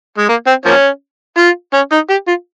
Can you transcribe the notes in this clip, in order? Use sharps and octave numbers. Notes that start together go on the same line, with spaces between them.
G#3
A#3
C4
F3 A#3 C#4
F4
C#4
D#4
G4
F4